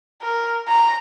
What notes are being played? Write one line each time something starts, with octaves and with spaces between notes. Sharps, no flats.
A#4
A#5